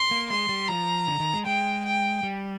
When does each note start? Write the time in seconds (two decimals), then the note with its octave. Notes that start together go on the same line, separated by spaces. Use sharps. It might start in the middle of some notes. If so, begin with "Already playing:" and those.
Already playing: C6
0.11 A#3
0.30 G#3 C6
0.49 G3
0.68 F3 A#5
1.08 D3
1.20 D#3
1.34 G#3
1.46 G#3 G5
1.85 G5
2.23 G3